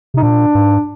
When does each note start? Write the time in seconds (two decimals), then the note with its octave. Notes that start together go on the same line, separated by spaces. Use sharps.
0.14 C3 D#4
0.22 A#2 D4
0.55 G#2